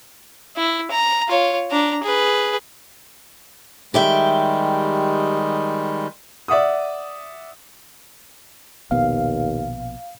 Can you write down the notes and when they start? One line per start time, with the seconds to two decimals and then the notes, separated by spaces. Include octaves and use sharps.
0.56 E4
0.91 A#5
1.28 F4 C#5
1.71 D4 A#5
2.03 G#4 B4
3.94 D#3 G3 G#3 G4 E5 G5
6.48 D5 E5 F#5 D#6
8.91 A#1 D#2 B2 B3 F5